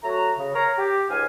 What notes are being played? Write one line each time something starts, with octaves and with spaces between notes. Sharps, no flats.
F#3 A3 F#4 A#5
C#3
A#4 C#5 F5 A#5
G4
C#2 G#2 F5 G#5